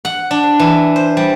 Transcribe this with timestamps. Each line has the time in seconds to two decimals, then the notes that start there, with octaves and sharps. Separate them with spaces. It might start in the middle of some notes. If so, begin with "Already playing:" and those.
0.05 F#5
0.31 D4
0.60 E3
0.96 C5
1.17 G3